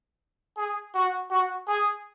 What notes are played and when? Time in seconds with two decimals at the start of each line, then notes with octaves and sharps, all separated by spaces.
0.57 G#4
0.94 F#4
1.31 F#4
1.67 G#4